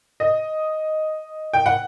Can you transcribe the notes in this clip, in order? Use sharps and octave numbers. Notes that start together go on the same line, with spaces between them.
D#5
G5
F#5